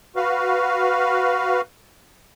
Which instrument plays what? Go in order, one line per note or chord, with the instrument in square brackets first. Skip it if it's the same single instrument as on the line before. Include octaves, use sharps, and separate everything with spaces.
[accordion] F#4 B4 F5